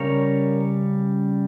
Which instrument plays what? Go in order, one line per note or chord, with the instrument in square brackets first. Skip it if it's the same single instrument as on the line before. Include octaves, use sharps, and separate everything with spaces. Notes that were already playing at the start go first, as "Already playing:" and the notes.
Already playing: [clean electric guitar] C#3 G3 A#4 C#5